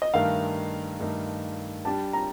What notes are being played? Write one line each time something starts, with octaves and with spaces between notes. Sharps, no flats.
D#5
G2 D#3 A3 D#4 A#4 F5
G2 D#3 A3 D#4 A#4
G3 D4 G4 A5
A#5